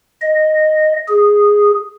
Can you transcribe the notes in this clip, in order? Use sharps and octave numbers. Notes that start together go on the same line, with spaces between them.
D#5
G#4